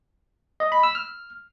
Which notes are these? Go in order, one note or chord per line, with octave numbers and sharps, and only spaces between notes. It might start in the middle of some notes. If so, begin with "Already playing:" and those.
D#5
B5
E6
F6